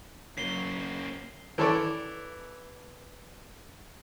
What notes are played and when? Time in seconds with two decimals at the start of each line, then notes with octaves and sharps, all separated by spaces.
0.38 C#3 F#3 A#3 C7 G7
1.58 E3 A4 C#5 D5